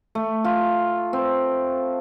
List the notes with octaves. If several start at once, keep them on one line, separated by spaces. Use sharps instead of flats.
A3
F4
C4